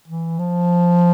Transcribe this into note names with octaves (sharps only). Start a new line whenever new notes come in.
E3
F3